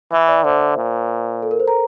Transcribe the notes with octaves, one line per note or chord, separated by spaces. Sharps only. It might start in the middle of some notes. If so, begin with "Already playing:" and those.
E3 E5
D5
D3 C5
A#2
A4
A#4
C5
A#5